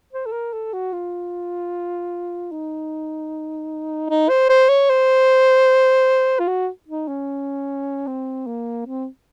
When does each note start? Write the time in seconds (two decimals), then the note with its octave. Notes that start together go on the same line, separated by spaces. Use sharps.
0.13 C5
0.26 A4
0.32 A#4
0.53 A4
0.73 F#4
0.93 F4
2.52 D#4
4.10 D#4
4.29 C5
4.50 C5
4.69 C#5
4.90 C5
6.39 F4
6.48 F#4
6.88 D#4
7.08 C#4
8.07 C4
8.47 A#3
8.86 C4